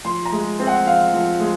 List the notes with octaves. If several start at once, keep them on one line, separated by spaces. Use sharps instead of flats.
F3 C6
A#5
G#3
C4
F#5
F3 F5
F3
G#3